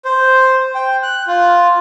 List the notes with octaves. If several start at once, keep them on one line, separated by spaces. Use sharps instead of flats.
C5
G5
F#6
F4